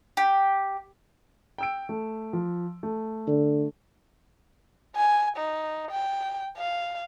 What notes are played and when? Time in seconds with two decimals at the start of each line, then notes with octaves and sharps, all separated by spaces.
0.17 G4
1.58 G5 E6 D7
1.89 A3
2.33 F3
2.83 A3
3.28 D3
4.96 G#5
5.37 D#4
5.91 G5
6.58 F5